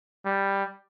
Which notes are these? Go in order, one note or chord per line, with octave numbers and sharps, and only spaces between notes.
G3